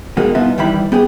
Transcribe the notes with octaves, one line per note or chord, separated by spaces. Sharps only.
B2 D#3 F#3 G#3 A#3 D#4
C2 B2 B3 D#4 F4 E5
D#2 D#3 E3 G3 E4 B5
B3 G4 G#4